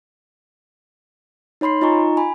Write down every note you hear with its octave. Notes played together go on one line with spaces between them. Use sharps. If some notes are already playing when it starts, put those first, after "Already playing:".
D#4 C#5 B5 C6 C7
D#4 F4 D#5 G#5 A#5 C#6
G#5 B5